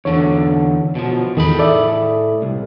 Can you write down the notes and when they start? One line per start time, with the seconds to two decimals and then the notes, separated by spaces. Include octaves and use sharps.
0.05 E2 D3 C#5
0.95 B2 F3
1.37 E2 A2 D#3 G#4 B5
1.59 A4 D5 E5
2.42 C2